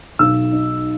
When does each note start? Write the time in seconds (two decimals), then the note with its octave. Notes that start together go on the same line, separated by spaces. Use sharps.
0.19 B1 E6
0.52 D#4